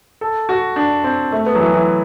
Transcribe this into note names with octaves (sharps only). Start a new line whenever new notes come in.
A4
F#4
D4
C4
A3
B3
F#3
E3
E3